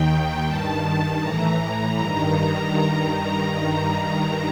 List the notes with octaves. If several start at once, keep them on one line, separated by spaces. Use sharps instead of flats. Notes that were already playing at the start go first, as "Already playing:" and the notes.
Already playing: D#2 D#3 G5
G2 D#3 A5
A2 E3 A#5
G2 D#3 A#5